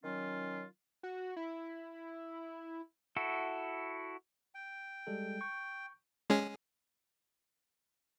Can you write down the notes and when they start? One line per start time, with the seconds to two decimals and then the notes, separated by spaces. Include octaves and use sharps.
0.04 D#3 F#3 C#4 F4
1.03 F#4
1.36 E4
3.16 E4 F#4 A4
4.54 G5
5.07 G3 G#3 A4
5.41 C#6 G6
6.30 G#3 C#4 G#4